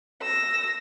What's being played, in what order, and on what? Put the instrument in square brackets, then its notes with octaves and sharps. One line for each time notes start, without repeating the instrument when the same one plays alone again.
[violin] E6 A#6